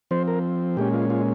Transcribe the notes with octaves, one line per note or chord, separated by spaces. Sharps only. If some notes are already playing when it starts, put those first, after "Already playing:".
F3 C4 C5
A#4
A#2 G#3 C#4 G4
F4
F4